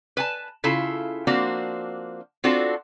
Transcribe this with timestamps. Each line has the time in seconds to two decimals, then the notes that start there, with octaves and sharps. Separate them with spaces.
0.17 B4 G#5 A5
0.64 C#3 E4 F4 A4
1.27 F3 A#3 C4 D4 F#4
2.44 C4 D4 F4 F#4 A4